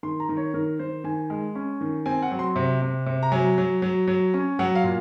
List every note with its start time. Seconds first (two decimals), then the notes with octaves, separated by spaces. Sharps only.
0.03 D#3 C6
0.20 A#5
0.29 D#3
0.37 C#5
0.54 D#3 A#4
0.79 D#3 C5
1.04 D#3 G#5
1.30 G#3
1.55 C#4
1.81 D#3
2.06 C4 G#5
2.22 F#5
2.31 F#3
2.39 C6
2.56 C3
2.82 C3
3.06 C3
3.23 A#5
3.32 F#3 G#5
3.58 F#3
3.82 F#3
4.07 F#3
4.34 C#4
4.59 F#3 F#5
4.75 F5
4.84 A#2